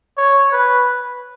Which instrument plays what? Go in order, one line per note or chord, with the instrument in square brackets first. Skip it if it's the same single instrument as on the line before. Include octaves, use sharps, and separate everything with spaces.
[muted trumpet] C#5
B4